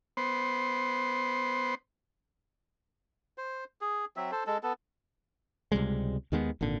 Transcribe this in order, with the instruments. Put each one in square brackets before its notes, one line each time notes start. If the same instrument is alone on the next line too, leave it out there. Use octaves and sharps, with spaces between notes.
[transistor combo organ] B3 C5
[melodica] C5
G#4
F#3 C4 E5
A4 C5
G#3 A4
B3 A4
[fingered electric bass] C#2 C3 G3 G#3
D#2 D#3 G#3 B3
G#1 A#2 D3